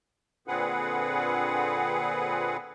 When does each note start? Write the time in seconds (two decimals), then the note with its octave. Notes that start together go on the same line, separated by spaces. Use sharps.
0.47 A#2 D3 C4 G#4 B4 F#5